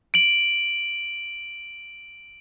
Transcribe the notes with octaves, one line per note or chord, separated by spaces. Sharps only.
D7 F#7